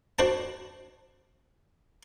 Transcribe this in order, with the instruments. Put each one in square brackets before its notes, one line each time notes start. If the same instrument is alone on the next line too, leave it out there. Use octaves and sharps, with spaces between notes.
[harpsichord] D4 F#4 C5 G5 A5